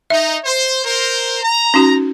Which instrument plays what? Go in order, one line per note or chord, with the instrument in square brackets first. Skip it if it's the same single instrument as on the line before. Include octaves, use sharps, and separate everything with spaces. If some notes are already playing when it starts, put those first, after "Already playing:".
[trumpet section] D#4 [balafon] E5
[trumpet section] C5
A#4 C5
A#5
[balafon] C#4 D#4 F#4